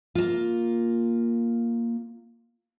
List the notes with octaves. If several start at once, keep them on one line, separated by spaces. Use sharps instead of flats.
A#3 F4